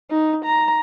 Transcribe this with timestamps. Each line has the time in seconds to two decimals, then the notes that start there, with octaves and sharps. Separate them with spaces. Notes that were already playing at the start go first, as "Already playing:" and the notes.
0.10 D#4
0.45 A#5